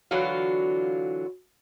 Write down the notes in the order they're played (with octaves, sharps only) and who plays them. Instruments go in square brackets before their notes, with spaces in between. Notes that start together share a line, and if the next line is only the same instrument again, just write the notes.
[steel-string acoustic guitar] D3 E3 F#3 F4 F#4 F5